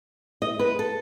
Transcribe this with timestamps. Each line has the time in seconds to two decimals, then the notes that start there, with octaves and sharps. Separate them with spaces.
0.42 D#5
0.59 B4
0.79 A4